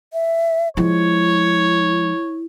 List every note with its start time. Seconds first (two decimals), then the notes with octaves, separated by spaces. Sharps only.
0.13 E5
0.77 F3 G#3 E4 C#5